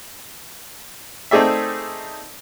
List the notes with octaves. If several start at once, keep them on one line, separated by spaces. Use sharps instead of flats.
A3 C4 D#4 G#4 D5 E5